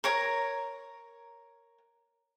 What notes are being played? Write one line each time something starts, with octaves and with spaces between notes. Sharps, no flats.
A#4 C#5 A#5